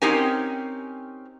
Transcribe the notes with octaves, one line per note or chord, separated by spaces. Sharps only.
C4 C#4 D#4 G4 A#4 G#5